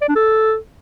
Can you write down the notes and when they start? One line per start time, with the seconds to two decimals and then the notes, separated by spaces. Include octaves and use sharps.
0.01 D5
0.08 D4
0.16 A4